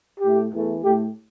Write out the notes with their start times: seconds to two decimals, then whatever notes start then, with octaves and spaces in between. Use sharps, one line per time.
0.20 A2 A3 G4
0.50 E2 E3 A3
0.81 A2 A3 G4